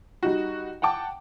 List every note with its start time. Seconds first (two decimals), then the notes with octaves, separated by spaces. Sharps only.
0.23 G3 D#4 F#4
0.82 F#5 G5 A5 D6